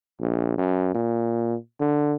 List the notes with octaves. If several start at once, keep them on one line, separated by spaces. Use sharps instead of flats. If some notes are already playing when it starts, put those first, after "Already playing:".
A#1
F#2
A#2
D3